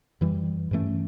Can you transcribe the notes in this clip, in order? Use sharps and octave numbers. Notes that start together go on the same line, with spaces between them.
F#2 E3 G3
G2 E3 A3 C#4